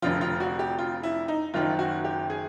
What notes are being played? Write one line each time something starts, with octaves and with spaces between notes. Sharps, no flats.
F1 F2 D3 F3 F4
F4
F#4
G4
F4
E4
D#4
F#1 F#2 D#3 F4
F#4
G4
G#4